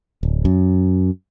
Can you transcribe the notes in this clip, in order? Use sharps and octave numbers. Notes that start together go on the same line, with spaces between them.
D1
F#2